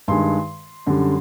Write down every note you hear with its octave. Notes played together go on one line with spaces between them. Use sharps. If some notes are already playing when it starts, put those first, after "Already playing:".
G2 D#3 G#3 C6
F#2 D3 G3